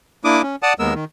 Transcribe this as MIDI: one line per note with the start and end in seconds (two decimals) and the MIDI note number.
0.24 0.42 58
0.24 0.42 62
0.24 0.42 64
0.24 0.42 86
0.24 0.42 87
0.42 0.56 61
0.63 0.73 74
0.63 0.73 78
0.63 0.73 81
0.63 0.73 87
0.79 0.94 39
0.79 0.94 56
0.79 0.94 59
0.79 0.94 70
0.79 0.94 88
0.94 1.05 51